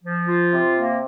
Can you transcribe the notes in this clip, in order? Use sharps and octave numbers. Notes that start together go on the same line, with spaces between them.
F3
F4
C3
A#3